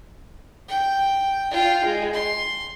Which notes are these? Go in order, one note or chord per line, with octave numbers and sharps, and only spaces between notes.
G5
F4 G5
G#3
C6